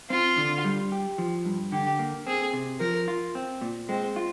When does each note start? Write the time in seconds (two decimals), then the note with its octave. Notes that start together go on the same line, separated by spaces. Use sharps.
0.10 C4 F4
0.38 D3
0.65 G3
0.92 G4
1.18 F3
1.45 G2
1.72 D3 G4
1.99 A#3
2.27 C4 G#4
2.53 C3
2.80 F3 A#4
3.08 F4
3.35 C4
3.61 A#2
3.89 G#3 C4
4.16 F4